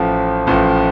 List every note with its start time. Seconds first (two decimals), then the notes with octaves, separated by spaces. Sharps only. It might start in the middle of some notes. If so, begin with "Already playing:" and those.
Already playing: A1 A2 F3
0.47 A1 A2 F3